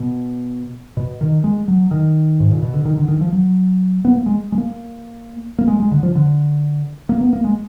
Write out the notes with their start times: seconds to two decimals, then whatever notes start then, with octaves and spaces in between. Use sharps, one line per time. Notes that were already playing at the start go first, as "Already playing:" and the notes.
Already playing: B2
0.97 B2
1.21 D#3
1.44 G#3
1.68 F#3
1.91 D#3
2.40 G#2
2.51 A#2
2.63 B2
2.74 D3
2.85 D#3
2.97 D3
3.08 D#3
3.21 F3
3.32 F#3
4.05 B3
4.16 A#3
4.26 G#3
4.52 G#3
4.58 A#3
5.58 A#3
5.68 G#3
5.80 G#3
5.91 D3
6.03 F3
6.15 D3
7.09 A#3
7.21 B3
7.33 A#3
7.44 G#3